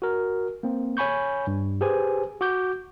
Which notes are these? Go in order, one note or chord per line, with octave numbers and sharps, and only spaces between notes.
F#4 A#4
A#3 C4
C#5 G#5 B5 C#6 G6
G2
G4 G#4 B4 C5 G#5
F#4 D6 G6